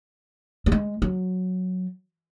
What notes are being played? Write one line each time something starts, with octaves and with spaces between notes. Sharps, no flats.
G3
G#3
F#3